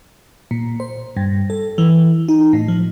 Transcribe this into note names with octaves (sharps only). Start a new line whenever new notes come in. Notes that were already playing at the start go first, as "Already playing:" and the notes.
A#2
C5
G2
A4
E3
D#4
A2
F3